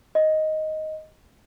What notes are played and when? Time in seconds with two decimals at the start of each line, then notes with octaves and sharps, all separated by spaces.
0.15 D#5